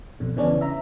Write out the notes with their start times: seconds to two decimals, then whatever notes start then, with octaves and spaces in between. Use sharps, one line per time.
0.20 F2 B2 D3
0.36 C#3 E3 B3 C#4 D4
0.61 E5 A#5